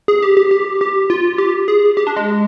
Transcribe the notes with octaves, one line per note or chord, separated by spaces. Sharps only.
G#4
G4
G4
G4
G4
F4
G4
G#4
G4
D4
G#3